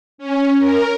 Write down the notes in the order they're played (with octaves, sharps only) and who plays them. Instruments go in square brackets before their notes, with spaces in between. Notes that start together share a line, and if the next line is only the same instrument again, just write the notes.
[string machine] C#4
A#4